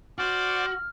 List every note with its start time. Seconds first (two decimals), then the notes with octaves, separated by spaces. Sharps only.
0.18 F#4 C5 D5 F6